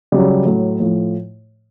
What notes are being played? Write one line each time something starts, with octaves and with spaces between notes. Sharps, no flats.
C#3 F#3 G3
A2 F#3
A2 F3